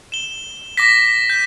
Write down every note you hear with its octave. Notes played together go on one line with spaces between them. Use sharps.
E7 G7
D6 A#6 B6
G6